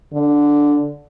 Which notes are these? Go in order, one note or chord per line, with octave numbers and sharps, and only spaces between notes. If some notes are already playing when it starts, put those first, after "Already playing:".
D3